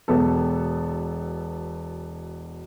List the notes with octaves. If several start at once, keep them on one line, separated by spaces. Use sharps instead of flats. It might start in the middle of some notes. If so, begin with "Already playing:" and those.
E1 B2 B3 A4